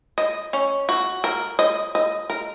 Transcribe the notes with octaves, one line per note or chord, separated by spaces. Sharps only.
D#5
C#4
F#4
A#4
D#5
D#5
A#4